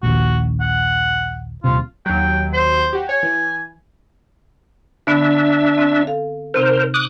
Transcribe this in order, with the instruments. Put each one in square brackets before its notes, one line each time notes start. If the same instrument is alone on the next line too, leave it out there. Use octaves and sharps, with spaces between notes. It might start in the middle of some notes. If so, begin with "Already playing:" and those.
[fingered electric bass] A#1 D#2 [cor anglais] F#4
[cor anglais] F#5
[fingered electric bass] D#1 C3 [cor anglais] F4
[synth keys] D#2 F#3 [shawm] G5
[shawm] C5
[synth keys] F#4 G4
[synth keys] C#5 [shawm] G#5
[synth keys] E3
[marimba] D3 B3 F#6 [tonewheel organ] D4 E5
[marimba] C4
A4 F5
[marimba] C3 C4 D#4 [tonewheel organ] A#4 C5
[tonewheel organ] D6 D#6 F#6